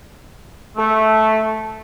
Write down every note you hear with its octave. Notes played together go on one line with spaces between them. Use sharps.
A3